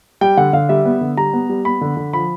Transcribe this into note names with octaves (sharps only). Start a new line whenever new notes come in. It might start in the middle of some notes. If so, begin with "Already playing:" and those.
G3 G5
D3 F#5
D3 F5
G3 E5
B3
D3
G3 A#5
B3
G3
B3 B5
D3
D3
F3 B5